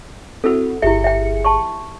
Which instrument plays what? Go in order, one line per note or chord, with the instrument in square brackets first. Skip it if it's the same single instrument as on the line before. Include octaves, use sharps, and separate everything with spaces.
[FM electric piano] C4 E4 F#4 [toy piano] A4 E6
[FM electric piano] G1 G#4 C#7 [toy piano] E4 G4 E5
[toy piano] E5 G5
A5 C6 C#6